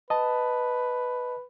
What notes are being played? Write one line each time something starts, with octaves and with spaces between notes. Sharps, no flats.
B4 D#5 A5